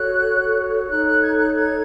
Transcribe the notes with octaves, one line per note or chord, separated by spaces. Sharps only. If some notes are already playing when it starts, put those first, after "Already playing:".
Already playing: F#4 A4 C#5 F#6
D#4 A4 C#5 F#6
F#6
G#6
F#6
G#6